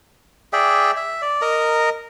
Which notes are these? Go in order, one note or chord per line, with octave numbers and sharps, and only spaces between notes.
G#4 D5 E5 G5
E5
D5
A#4 D#5 A#5